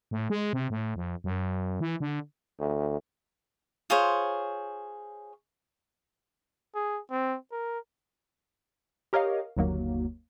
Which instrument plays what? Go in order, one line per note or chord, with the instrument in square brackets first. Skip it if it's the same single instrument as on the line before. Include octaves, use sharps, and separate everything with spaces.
[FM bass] A2
G#3
C3
A2
F2
F#2
E3
D3
[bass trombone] D2
[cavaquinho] F4 G#4 C5 C#5
[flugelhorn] G#4
C4
A#4
[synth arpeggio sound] G4 A#4 C#5 D#5 F5
G1 D#2 F#3 A#3